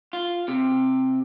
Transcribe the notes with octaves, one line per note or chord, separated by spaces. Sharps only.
F4
C3